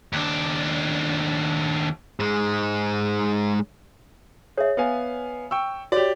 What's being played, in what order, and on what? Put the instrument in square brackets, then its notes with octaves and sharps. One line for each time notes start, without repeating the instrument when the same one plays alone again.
[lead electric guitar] D#2 D4
G#2 G#3
[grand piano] G#4 [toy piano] C#5 E5
[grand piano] B3 F5 G#5
G5 C#6 E6
[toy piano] F#4 C#5 [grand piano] G4 D5